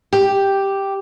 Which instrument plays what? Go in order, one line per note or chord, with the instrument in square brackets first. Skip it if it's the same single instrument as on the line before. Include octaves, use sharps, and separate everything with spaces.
[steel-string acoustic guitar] G4